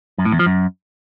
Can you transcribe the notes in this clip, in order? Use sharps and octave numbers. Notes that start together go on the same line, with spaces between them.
F#2
A2
E2
F3
F#2